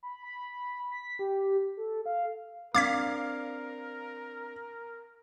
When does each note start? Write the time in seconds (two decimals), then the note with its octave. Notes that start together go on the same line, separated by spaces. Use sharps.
0.03 B5
0.24 B5
0.91 B6
1.19 G4
1.77 A4
2.06 F5
2.75 C4 D4 A#4 F5 D6 G#6 B6